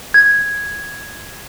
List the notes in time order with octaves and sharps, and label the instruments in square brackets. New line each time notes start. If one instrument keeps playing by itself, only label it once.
[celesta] G#6